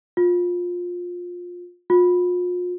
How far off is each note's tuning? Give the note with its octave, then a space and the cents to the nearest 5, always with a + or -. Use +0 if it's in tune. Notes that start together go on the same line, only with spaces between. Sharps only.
F4 +20
F4 +40